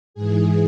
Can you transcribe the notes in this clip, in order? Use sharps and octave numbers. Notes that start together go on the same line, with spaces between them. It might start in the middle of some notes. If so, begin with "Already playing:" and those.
G#2 E3 G#4